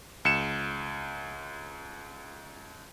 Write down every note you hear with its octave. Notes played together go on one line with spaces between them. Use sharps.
C#2 C#7 E7